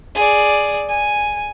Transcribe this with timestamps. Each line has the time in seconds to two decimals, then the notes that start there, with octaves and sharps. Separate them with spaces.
0.15 G#4 D5
0.88 G#5